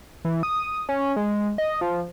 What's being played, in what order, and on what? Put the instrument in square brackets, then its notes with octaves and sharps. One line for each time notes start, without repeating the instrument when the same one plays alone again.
[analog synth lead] E3
D#6
C#4
G#3
D#5
F3